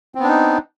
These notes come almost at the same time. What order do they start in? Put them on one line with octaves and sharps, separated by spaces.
C4 B3 D4 D#4